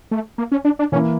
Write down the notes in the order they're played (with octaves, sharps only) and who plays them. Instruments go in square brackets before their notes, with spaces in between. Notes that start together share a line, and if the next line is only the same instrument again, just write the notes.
[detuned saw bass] A3
A#3
C#4
D4
D4
[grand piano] E3 A#3 E4 [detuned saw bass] C#4